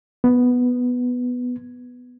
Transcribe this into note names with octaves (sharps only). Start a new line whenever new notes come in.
B3